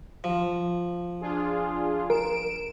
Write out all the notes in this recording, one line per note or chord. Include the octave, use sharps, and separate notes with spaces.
F3
D4 F4 G#4
A#4 D7 E7